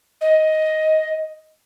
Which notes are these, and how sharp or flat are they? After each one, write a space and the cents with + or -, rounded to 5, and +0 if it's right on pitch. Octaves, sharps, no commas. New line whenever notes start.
D#5 +10